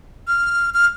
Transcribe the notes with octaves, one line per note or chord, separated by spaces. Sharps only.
F6
F6